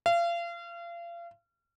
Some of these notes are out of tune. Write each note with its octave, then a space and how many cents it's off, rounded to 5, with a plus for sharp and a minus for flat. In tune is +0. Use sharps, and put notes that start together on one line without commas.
F5 -35